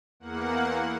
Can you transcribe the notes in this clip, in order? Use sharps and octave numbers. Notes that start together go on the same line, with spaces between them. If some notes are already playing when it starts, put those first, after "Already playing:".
E2 A#3 F#5